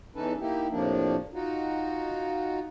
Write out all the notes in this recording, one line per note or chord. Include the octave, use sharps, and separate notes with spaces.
E2 E3 C#4 D#4 A4 B4
A#3 D#4 E4 G4
A2 C3 F3 A#3 D4
D#4 F4 F#4